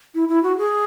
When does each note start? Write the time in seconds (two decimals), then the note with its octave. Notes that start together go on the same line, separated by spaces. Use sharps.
0.15 E4
0.29 E4
0.43 F#4
0.58 G#4